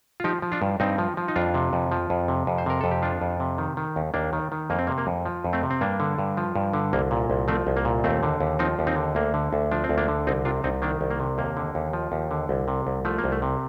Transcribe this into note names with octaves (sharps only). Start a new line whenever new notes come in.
F4
F3 D#4 G4
F3
D4 F4
G2
G2 C4 D#4
F3
F3
D#4
F2 D4 F4
C3
F2
F3
F2
C3
F2
C5
C3 A#4
F2 A4
G4
F3 D4 F4
F2
C3
D#3
D#3
D#2
D#2 A#3 D4
D#3
D#3
F2 A#3
C4
C3 A#3
A#3
F2
F3
F2
A3 C4
C3
C4
G2 A#3 D4
D3
G2
F3
G2
D3
C2 A#3
A#2
C2
F3 A3 C4
C2
A#3
A#2
D#2 A3 C4
D3
D#2
F3 C4 D#4
D#2
C4 D#4
D3
D2 A#3
D3
D2
F3 D4
C4
D2
A#3 D4
D3
C2 C4 D#4
C3 D4 F4
C2 C4 D#4
D#3 A#3 D4
C2
A#3
C3
D#2 A#3
D3
D#2
F3
D#2
D3
C2
C3
C2
F3 A3
A#3
C2
A3
C3